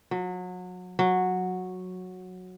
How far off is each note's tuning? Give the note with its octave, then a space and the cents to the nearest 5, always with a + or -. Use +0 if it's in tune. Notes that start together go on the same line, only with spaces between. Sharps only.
F#3 -30
F#3 -10